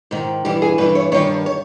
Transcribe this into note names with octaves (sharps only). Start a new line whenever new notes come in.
G#2 D#3
G2 E3 G4
G#4
G2 E3 B4
C#5
G2 D#3 C#5
C#5